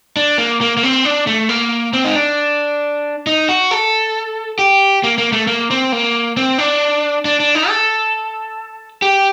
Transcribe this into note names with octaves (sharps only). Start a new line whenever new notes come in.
D4
A#3
A#3
A#3
C4
D4
A3
A#3
C4
D#4
D4
D#4
F#4
A4
G4
A#3
A#3
A3
A#3
C4
A#3
C4
D4
D4
D4
D#4
A4
G4